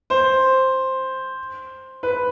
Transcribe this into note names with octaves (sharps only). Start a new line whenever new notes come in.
C5
B4